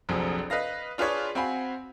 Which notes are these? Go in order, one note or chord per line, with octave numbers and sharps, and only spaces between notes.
F1 A#1 F2 F3 F#3 G#4
B4 D#5 F5 A#6
D4 F4 G#4 B4 C#5
C4 F#4 F5 G#5 B5